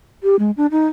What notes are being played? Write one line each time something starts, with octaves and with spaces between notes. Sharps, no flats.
G4
G#3
D4
D#4